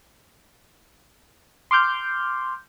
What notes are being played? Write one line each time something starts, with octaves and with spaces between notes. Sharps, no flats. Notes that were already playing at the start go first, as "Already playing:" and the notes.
C6 D6 F6 G6